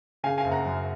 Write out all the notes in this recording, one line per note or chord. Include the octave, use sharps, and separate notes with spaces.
C#3 F5 G#5
F5 G#5
F#1
F#5 A#5
F#2